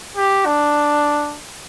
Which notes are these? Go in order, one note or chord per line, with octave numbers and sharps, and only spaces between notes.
G4
D4